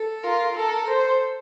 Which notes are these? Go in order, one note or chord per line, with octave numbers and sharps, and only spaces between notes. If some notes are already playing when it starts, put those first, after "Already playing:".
Already playing: A4
F4 A#4
A4 A#4
A4 C5